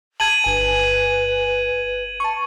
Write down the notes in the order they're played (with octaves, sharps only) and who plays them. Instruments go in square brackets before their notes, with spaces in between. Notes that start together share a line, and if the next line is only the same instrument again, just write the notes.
[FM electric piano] A5 [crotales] G#6 D#7 F#7
[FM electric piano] G1 G#5 [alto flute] B4
[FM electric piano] A5 C#6